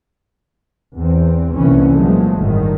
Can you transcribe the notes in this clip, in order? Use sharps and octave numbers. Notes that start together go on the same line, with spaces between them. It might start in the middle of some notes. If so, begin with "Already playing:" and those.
E2 C4
F1 C2 A#2 D3 E3 C#4
A#2 F3 F#3 G#3 A3
G1 D2 A2 D#3